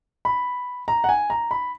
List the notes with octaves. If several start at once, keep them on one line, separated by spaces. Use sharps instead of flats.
B5
A#5
F#5
G#5
A#5
B5